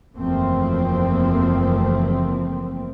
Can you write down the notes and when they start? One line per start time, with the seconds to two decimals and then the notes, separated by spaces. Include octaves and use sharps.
0.16 F#1 E2 F3 A3 A#3 C4